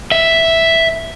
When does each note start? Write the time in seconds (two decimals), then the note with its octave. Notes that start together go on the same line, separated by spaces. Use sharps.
0.12 E5